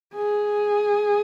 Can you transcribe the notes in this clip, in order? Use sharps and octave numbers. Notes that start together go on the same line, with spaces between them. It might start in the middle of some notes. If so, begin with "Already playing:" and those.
G#4